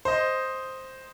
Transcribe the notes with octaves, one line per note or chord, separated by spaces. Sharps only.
C5 D#5